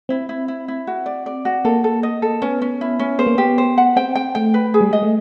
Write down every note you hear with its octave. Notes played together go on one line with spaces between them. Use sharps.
C4 E4
E4
E4
E4
F#4
D5
D5
F#4
A#3 A4
A4
D#5
A4
B3 C#4
C#4
E4
C#4
B3 C5
A#3
B3 G4
C5
F#5
C4 G5
G5
A3 G5
B4
G#4
G3
G#3 D#5
A3